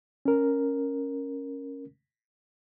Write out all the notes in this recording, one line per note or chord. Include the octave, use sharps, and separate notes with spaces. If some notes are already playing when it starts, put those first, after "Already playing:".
C#4 A#4